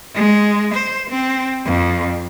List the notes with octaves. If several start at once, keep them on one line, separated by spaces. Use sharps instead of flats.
G#3
C5
C4
F2